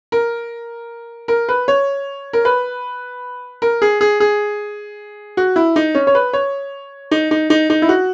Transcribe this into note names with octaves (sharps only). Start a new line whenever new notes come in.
A#4
A#4
B4
C#5
A#4
B4
A#4
G#4
G#4
G#4
F#4
E4
D#4
C#4
C#5
B4
C#5
D#4
D#4
D#4
D#4
E4
F#4